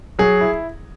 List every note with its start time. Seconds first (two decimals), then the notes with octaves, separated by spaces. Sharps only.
0.19 F#3 G#4
0.41 E4